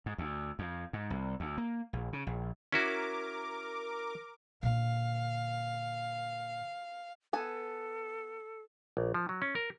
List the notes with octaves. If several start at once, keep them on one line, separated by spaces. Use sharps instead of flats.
G#2
D2
F2
G#2
C2
D2
A#3
A#1
C#3
A#1
C#4 E4 F#4 A#4 D6
A#2 D3 F5
B3 A4 G#5 A5
A#1
F3
F#3
C#4
A#4